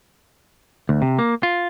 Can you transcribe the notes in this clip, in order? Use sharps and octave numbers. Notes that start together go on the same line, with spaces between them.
D2
C3
A#3
F4